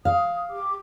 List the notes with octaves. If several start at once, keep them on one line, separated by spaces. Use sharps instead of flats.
F5 D#6
G4 D6